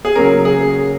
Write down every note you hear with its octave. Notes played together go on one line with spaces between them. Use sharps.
G#4
C#3 F#3 A#3 C#4 A#4
G#4